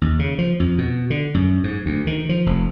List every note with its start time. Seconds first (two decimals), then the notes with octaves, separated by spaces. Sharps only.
0.01 D#2
0.19 C#3
0.38 F3
0.60 F2
0.78 B2
1.10 D3
1.34 F#2
1.64 G#2
1.86 D2
2.07 D#3
2.29 F3
2.46 F1